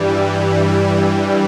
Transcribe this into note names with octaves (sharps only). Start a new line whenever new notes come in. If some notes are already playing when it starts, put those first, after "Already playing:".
Already playing: G2 E3 G3